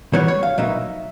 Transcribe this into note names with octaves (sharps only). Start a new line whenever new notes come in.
E3 G3 B3 C#5
C#5
F5
B2 F#3 A#3 D#4 E5